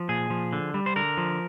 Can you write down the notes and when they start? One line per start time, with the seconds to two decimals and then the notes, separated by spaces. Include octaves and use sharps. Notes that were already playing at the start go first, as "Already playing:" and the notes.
Already playing: F3
0.09 A#2 G#4
0.30 F3
0.53 D3
0.74 G3
0.86 C5
0.96 D3 A#4
1.17 F3